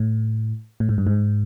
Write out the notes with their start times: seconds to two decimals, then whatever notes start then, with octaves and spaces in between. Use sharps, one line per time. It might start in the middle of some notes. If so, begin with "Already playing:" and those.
Already playing: A2
0.80 A2
0.89 G#2
0.98 G2
1.07 G#2